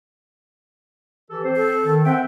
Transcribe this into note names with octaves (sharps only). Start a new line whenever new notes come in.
E3 G4 A4
C4 C5
A4
D#3
C4 E5 F#5 G5